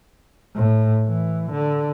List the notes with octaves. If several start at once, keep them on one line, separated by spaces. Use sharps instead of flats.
A2
E3
D3